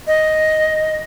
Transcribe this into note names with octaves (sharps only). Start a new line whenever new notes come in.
D#5